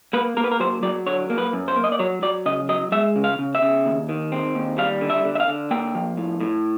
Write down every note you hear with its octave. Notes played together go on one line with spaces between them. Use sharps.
A#3 B4
A#3 A#4
B4
A#4
F#3 C5
F#3 D5
D3 C#5
A#3
B4
F#2
C5
A#3
D#5
D5
F#3 C#5
F#3 D5
C#3 D#5
F#3 D#5
G#3 E5
C#3
F5
C#3
E5
C#3
D#2
D#3
C4
D#2
G3 F5
D3
E5
D3
E5
F5
D3
A#3 G5
F3
A2
A2